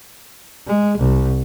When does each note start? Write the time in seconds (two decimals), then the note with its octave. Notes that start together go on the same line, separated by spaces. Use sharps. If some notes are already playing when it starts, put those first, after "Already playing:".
0.67 G#3
0.98 C2